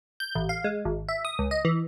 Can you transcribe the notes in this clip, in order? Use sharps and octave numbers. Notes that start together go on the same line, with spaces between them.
G6
A1
F5
G#3
G#1
E5
D#6
C#2
D#5
E3